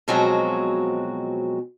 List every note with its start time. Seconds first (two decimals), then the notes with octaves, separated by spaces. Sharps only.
0.08 B2 F3 F#3 G#3 C4 F#4